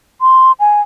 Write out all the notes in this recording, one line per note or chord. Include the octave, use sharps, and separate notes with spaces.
C6
G#5